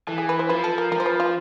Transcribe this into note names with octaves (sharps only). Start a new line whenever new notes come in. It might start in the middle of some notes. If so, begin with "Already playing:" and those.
E3 A4
G#4
B4
C5
F3 B4
A4
A#4
F3 A#4
C5
B4
F4